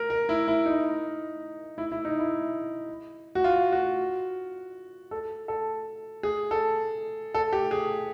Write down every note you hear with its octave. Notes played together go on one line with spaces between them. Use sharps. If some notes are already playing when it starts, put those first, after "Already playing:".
Already playing: A#4
A#4
E4
E4
D#4
E4
E4
D#4
E4
F#4
F4
F#4
A4
A4
G#4
A4
A4
G4
G#4